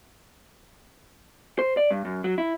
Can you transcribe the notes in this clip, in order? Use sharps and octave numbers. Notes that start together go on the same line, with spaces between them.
C5
D5
G2
F#2
F#3
E4